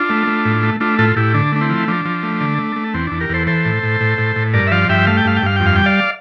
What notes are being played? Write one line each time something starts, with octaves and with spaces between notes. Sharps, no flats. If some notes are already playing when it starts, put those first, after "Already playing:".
Already playing: D4 F4
A3
A3
A2
A3
A3 D4 F4
A2 F4 A4
A2 E4 G4
D3 D4
A3 D4
C4 E4
F3
F3 D4
F3
A3
D3
A3
A3
E2 C4
E2 D4
G4 A#4
E2 A4 C5
E3 A4 C5
A2
A2
A2
A2
A2
G2 A#4 D5
E5
F3 D5 F5
G2 E5 G5
A3 F5
G5
G2 F5
G5
G2 F5
F2 G5
F5
G3 G5
D5 F5